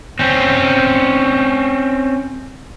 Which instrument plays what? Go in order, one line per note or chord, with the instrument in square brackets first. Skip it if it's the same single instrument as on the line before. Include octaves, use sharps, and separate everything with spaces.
[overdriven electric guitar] C4 C#4